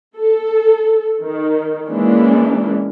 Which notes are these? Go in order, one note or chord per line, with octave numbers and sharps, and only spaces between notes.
A4
D#3
E3 G#3 A#3 C#4 D4 E4